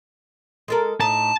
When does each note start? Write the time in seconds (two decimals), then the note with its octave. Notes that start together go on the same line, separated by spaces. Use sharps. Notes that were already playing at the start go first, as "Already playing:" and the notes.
0.68 G#3 A4 A#4
1.01 A2 D#4 A5